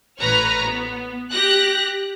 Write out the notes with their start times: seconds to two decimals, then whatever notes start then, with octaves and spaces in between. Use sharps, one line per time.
0.20 A1 B4 C#5 A#5 F6
0.65 B3
1.32 G4 F#6 A#6